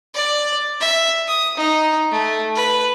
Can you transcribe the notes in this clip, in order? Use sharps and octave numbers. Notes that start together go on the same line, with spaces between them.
D5
E5
D#6
D#4
A3
B4